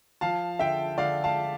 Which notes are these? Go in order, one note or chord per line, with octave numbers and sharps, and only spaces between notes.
F3 F5 A5
D3 E5 G5
D3 D5 F5
F5 A5